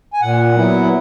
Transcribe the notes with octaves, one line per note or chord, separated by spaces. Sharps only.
G#5
A#2 F#5
F#3 B3 E4